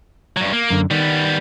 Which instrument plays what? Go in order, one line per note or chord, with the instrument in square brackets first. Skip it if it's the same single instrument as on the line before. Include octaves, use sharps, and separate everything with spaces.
[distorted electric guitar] G2 F#3
A#3
[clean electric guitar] F#2 D3
[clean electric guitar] D#3 [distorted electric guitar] G3 B3